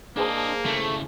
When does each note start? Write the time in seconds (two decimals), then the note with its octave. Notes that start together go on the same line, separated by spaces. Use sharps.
0.17 A#3 D4 G#4 C5 D#5 A5
0.66 C#3 A3 E4